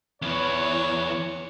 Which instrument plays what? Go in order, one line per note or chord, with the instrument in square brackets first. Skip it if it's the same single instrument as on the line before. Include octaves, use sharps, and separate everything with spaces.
[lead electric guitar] E2 E3 [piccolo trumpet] C#5